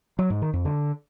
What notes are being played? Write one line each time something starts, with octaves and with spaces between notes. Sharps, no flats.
F#3
G#2
D#3
F2
D3